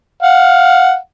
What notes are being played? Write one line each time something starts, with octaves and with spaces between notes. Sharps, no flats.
F5 F#5